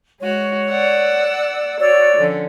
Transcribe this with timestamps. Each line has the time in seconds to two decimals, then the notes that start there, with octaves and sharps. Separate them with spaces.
0.20 G#3 F#4 C#5
0.69 D5 F#5 E6
1.80 F#4 C#5 D5 E6
2.17 D3 F3 C#4